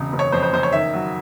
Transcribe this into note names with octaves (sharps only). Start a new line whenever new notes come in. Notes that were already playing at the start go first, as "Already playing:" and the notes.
Already playing: E1 C#3
F#1
C#5
F2 C5
C5
F#1 C5
C#5
D#3 E5
F#3